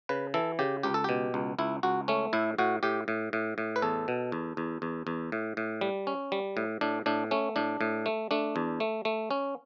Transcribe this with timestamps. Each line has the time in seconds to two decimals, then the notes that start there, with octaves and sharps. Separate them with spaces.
0.09 C#3 B4
0.34 E3 A4
0.59 C#3 G4
0.83 C#2 G4
0.94 A4
1.04 B2 G4
1.34 C#2
1.59 C#2 E4
1.83 C#2 F#4
2.08 A3 C#4
2.33 A2 E4
2.58 A2 F#4
2.83 A2 G4
3.08 A2
3.33 A2
3.58 A2
3.76 B4
3.82 E2 A4
4.08 B2
4.32 E2
4.57 E2
4.82 E2
5.07 E2
5.32 A2
5.57 A2
5.81 G3
6.07 C#4
6.32 G3
6.57 A2
6.81 A2 D4
7.06 A2 D4
7.31 A3 C#4
7.56 A2 D4
7.81 A2
8.06 A3
8.31 A3 D4
8.56 E2
8.80 A3
9.05 A3
9.31 C#4